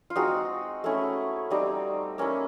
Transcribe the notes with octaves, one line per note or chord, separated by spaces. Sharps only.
F4
G#3 C4 D#4 F#4
A3 C#4 E4
G3 C4 D#4
A#3 C#4 E4